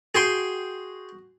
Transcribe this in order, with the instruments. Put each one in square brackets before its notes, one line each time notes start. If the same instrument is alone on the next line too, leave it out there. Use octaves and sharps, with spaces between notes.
[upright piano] F#4 [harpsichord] G#4 G5 C6